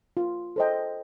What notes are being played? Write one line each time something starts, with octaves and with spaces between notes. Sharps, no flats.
F4
A4 C5 D#5 G5